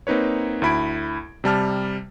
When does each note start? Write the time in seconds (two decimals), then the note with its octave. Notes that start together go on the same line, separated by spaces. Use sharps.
0.07 A#3 C4 D#4 B4 C#5
0.62 D2 E4 B5 G#6 D7
1.44 C3 G3 A5 F6